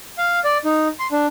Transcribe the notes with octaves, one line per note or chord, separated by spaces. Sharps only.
F5
D5
D#4
C6
D4